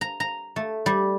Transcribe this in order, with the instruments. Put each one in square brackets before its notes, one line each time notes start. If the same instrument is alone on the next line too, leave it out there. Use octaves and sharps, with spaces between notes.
[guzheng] A#5
A#5
A3
G3